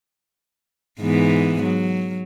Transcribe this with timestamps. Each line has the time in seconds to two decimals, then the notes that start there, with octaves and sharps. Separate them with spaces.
1.00 G#2 E3 B3
1.62 F#3